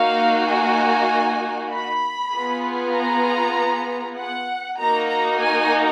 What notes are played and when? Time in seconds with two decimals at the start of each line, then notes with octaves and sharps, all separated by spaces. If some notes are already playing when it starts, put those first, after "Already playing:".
Already playing: A#3 D#4 F#4 F5
0.46 G#5
1.70 B5
2.31 B3 F4 G#4
2.93 A#5
4.17 F#5
4.78 A#3 D#4 F#4 A#5
5.09 A#5
5.40 G#5